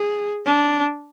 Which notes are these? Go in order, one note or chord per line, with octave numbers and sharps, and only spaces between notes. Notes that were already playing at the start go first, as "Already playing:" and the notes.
Already playing: G#4
D4